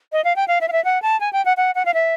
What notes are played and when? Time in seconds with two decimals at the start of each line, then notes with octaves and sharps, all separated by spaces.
0.12 D#5
0.24 F5
0.36 G5
0.48 F5
0.61 E5
0.68 F5
0.72 E5
0.84 F#5
1.02 A5
1.20 G#5
1.33 G5
1.45 F#5
1.57 F#5
1.75 F#5
1.85 F5
1.94 E5